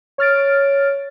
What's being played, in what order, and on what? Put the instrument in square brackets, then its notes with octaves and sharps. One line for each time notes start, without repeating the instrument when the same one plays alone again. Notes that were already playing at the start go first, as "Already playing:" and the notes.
[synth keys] C#5 F6 A6 D7